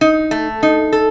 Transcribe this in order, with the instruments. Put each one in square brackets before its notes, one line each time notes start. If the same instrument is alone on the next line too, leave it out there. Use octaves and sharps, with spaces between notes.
[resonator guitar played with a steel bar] D#4
A3
D#4
A4